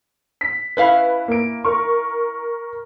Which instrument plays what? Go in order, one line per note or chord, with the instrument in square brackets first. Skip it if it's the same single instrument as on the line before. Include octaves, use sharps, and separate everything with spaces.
[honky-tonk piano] B6
[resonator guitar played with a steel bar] C#4 E4 F5 [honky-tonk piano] B4
[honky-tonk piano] A#3 D7
A#4 C#6